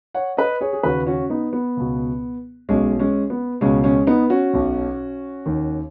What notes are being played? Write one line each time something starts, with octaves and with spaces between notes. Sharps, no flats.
C#5 F#5
B4 D#5
G#4 C#5
G#4
D#2 C#3 F#4 B4
C#4 F#4
B3 D#4
B3
C#2 B2
B1 B2 G#3 C#4
G#3 C#4
B3
C#2 B2 G#3 C#4
G#3 C#4
B3 D#4
C#4 F#4
B1 B2
D#2 D#3